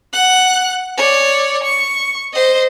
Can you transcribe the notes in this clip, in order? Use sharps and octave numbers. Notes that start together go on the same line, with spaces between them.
F#5 F#6
C#5 D5
C#6
C5 D#5